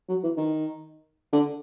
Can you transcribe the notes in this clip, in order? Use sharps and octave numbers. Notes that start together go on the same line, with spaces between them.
F#3
E3
D#3
D3